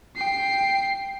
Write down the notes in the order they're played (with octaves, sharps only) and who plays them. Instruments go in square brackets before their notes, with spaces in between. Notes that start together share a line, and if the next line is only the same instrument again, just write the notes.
[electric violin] G5 C7